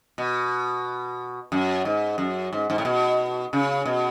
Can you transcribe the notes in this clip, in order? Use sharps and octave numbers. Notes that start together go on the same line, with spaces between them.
B2
F#2
G#2
F#2
G#2
G#2
A2
B2
C#3
B2